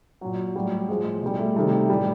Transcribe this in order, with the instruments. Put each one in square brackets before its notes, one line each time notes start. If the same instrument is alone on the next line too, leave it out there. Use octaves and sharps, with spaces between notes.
[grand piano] A#2 F#3
A2 F#3 G3
A2 F3 G#3
B2 G3 G#3
A3
C3 D#3 G3 A3
A2 E3 G3